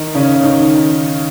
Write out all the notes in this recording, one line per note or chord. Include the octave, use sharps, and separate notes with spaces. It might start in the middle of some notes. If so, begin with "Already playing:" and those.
Already playing: D#3 D#4
C#3 C#4
D#3 D#4